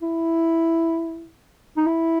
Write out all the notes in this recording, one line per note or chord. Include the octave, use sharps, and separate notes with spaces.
E4
D#4
E4